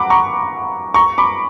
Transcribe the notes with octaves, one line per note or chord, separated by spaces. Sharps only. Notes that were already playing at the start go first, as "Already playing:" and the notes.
Already playing: F#5 A#5 B5 D6
A#5 C#6
A#5 C#6
B5 D6